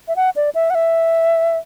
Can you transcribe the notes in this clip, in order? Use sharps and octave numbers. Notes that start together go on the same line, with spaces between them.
E5
F#5
D5
E5
F#5
E5